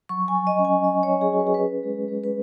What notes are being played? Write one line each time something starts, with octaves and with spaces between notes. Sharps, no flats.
F#3 C#6
G#5
F#3
D#5
C#4
G#5
F#3 D#5
C#5
C#4
G#4
F#4
B4
G#4
C#4 B4
G#3
G#3
B4